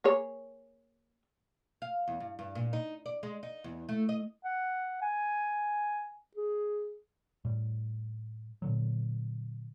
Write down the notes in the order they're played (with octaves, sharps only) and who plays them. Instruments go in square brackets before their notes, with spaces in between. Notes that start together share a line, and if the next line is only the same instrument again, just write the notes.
[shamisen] A#3 G#4 C#5
[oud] F5
E2
G2
G2
A#2
D#4
D5
G#3
D#4
E2
A3
D#5
[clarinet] F#5
G#5
G#4
[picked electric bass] A2 G3
A#2 D3 F#3